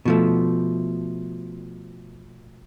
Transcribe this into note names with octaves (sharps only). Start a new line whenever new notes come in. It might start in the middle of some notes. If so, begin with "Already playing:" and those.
B2 F3 A3